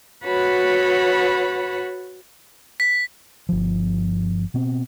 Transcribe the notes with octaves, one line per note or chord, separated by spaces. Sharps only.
F#4 B4 C#5 F#5 A5 B5
B6
G1 F3
B2 B3 C4